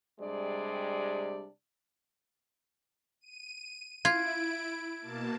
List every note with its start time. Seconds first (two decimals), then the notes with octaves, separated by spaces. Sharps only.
0.20 C3 G3 G#3 D4 D5
3.21 D#7
4.05 E4 F4 G#6 D7
5.00 B2 A#3 A5